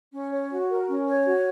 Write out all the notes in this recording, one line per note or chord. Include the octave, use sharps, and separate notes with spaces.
C#4
C#5
F#4
A#4
C#4
C#5
F#4